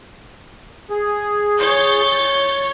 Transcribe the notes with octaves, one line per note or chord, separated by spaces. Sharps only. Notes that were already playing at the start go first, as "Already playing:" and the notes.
G#4
C#5 G6 A6